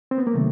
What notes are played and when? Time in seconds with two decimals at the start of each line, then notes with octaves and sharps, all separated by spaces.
0.11 C4
0.18 B3
0.27 A#3
0.34 C3 D#3 F#3 A3